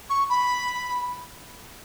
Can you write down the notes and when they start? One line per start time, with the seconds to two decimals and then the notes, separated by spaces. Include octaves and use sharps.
0.10 C#6
0.29 B5